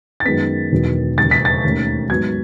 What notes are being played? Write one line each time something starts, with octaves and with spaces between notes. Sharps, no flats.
A6
F#2 D#3 G#3 B3 B6
E1 E2 D#3 F#3 B3
E1 D#2 C#3 A6
B6
A6
E1 D#2 D#3 A3 C#4
G#2 F#3 B3 G#6